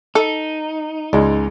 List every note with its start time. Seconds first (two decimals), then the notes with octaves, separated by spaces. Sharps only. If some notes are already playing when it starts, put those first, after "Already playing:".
0.15 D#4 A4
1.13 C#2 G#2 G#3 D5